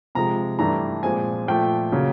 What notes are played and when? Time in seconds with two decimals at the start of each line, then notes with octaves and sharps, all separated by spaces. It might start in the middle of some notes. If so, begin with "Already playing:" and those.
0.15 C3 F3 G#3 A#5
0.59 G2 E3 A3 D4 A#5
1.03 A#2 F3 G#3 C4 G#5
1.47 A#2 F3 A3 G5
1.92 C#3 F#3 A#3